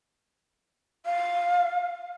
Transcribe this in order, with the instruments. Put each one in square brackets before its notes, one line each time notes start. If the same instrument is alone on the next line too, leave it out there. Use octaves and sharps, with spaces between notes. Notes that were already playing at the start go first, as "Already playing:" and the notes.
[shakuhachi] F5